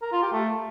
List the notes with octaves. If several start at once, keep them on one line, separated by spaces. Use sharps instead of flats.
A#4
F4
G4
A3